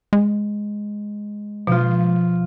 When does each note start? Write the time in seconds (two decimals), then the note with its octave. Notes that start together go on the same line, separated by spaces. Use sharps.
0.13 G#3
1.67 B2 F3 F4